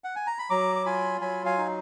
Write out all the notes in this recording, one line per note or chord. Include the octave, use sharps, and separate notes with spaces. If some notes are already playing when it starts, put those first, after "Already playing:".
F#5
G#5
A#5
B5
F#3 A#5 D6
D6
F4 G#5 B5
F#3 G#5 B5
F5 G#5
D#4